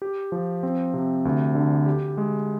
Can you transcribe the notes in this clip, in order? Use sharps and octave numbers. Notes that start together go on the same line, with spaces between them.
G4
F3
C4
C3
D2
D3
G4
G#3